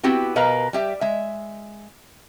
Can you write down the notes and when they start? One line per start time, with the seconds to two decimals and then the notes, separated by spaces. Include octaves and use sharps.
0.03 B3 C4 E4 F#4 G4
0.36 B2 A#4 B4 D#5 F5 A#5
0.73 G3 G4 E5
1.01 G#3 E5